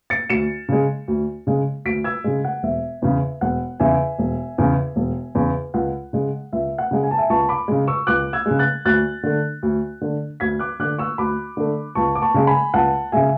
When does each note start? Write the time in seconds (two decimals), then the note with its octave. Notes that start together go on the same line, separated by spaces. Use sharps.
0.10 A6 C#7
0.30 D2 C#7 E7
0.69 C#3 G#3
1.08 D2
1.47 C#3 G#3
1.85 D2 B6 D7
2.04 E6 G#6
2.24 C#3 G#3
2.44 F#5
2.63 E1 E5
3.02 E2 C#3
3.41 E1 F#5
3.80 E2 C#3 E5 G#5
4.18 E1
4.58 E2 C#3
4.96 E1
5.35 E2 C#3
5.74 C#2 F#5
6.13 C#3 G#3
6.53 C#2 E5
6.78 F#5
6.91 C#3 G#3
7.03 G#5
7.11 A5
7.18 E5 G#5
7.30 C#2 A5 C#6
7.49 B5 D6
7.68 C#3 G#3
7.87 C#6 E6
8.07 C#2 D6 F#6
8.33 E6 G#6
8.46 C#3 G#3
8.59 F#6 A6
8.85 D2 F#6 A6
9.23 D3 A3
9.63 D2
10.01 D3 A3
10.40 D2 G#6 B6
10.59 D6 F#6
10.79 D3 A3 D6 F#6
10.98 C#6 E6
11.18 D2 B5 D6
11.57 D3 A3
11.95 C#2 A5 C#6
12.15 D6
12.22 A5 C#6
12.34 C#3 G#3
12.47 G#5 B5
12.74 C#2 F#5 A5
13.12 C#3 G#3 E5 G#5